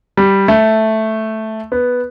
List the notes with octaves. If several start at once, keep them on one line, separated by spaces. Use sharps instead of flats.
G3
A3
B3